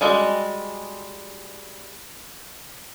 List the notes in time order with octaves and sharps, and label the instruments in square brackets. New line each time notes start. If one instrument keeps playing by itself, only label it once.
[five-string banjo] G3 G#3 F#4